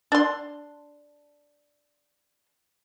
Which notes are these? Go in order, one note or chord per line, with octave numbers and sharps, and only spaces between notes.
D4 C6